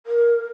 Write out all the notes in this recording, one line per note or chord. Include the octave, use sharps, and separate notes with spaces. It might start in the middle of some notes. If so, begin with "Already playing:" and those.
A#4